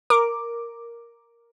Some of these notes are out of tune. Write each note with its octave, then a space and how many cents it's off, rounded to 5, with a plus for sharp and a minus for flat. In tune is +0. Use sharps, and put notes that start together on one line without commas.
A#4 +0 D6 +0